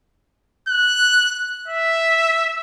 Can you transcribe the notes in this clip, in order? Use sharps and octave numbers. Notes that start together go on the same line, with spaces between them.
F#6
E5